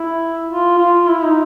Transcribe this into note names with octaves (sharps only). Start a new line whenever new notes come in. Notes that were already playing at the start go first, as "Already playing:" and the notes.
Already playing: E4
F4
F4
E4
D#4